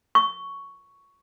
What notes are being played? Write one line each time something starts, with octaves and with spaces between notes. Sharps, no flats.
C#6